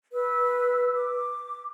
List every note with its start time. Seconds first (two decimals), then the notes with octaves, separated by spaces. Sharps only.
0.13 B4 E6
0.96 D6